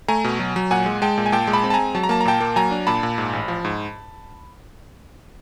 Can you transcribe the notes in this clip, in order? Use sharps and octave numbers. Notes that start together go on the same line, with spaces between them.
A3 G#5 A#5
B2
F#3
F#3
A#2 F#5 G#5
G#3
G#3 G5 A5
A#2
G#5
A#2 G5 A5
G#3
A5 B5
C4
A5
G#3 G#5 A#5
F#3 A5
A#5
A#3 A5
A#5
A#2 G5 A5
A#3
F#3 G#5 A#5
D4
A#2 A5 B5
A#2
G#2
A1
F3
G#2